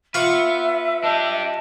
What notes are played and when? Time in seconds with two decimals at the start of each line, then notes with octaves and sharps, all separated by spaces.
0.14 F4 B4 E5 F#5 C#6
1.03 D4 G4 D#5 A5